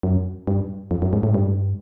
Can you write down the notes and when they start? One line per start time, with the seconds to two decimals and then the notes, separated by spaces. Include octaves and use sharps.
0.03 F#2
0.47 G2
0.91 F2
1.02 F#2
1.13 G#2
1.23 A2
1.29 G#2
1.34 G2